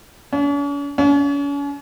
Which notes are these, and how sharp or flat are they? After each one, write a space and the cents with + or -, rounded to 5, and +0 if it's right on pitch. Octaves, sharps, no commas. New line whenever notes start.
C#4 +45
C#4 +40